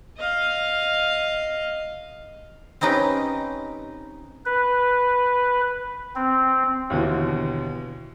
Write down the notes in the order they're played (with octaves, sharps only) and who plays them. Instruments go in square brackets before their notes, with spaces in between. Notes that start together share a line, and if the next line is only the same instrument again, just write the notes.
[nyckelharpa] D#5 F5
[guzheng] C4 C#4 D#4 G4 B4
[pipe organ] B4
C4
[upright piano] D#2 B2 D3 E3